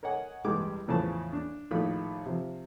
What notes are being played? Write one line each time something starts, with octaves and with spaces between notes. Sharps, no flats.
A#4 C#5 D#5 F#5 G#5
A1 G2 G3 G#3 D6
E2 A2 C#3 F3 B4 A5
D4
A#1 A2 D#3 F4 B5
C3 F3